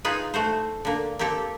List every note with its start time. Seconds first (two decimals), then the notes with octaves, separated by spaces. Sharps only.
0.05 D#4 F4 G#4 B4
0.34 A3 F#4 C5
0.85 D3 A#3
1.19 A#3 C4 G4 A4